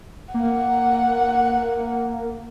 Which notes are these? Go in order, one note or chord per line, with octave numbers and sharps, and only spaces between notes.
A#3 F#5